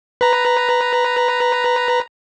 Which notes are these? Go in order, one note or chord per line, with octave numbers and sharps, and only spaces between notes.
B4 A#5